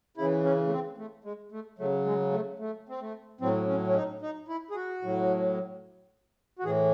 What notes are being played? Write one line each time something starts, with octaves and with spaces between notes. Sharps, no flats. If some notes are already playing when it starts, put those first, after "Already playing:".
C#3 E3 E4
C#4
A3
C4
A3
G#3
A3
C#3 F#3 A3
G#3
A3
A3
C4
A3
A2 F#3 C4
C#4
C#4
D#4
D#4
E4
G#4
F#4
A2 F#3
F#4
A2 E3 G#4